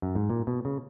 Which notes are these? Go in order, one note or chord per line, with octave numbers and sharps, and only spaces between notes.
F#2
G#2
A#2
B2
C#3